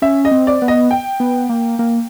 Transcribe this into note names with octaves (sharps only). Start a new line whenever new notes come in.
C#4 E5
D#5
C4
D5
B3
D#5
G5
B3
A#3
A#3